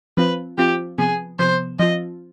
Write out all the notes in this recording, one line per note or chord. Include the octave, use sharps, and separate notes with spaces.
F3 C4 F4 B4
F3 C4 F4 G4
C3 F3 B3 G#4
C3 F3 B3 C5
F3 C4 F4 D#5